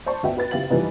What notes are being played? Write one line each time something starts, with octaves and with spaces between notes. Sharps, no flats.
C5 D5 A5 C#6
D2 B3 F#4 D#5 E5 G5
F#4 B4 A6
F#1 E4 G4 F5 A6 F#7
F1 E3 F3 G3 D#4 B4